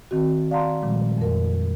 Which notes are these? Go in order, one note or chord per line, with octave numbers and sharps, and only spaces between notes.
D#3 C4 F#4
D5 F5 F#5 A5 A#5 C6
A#2 D#3 F3 G3 G#3
F2 A#4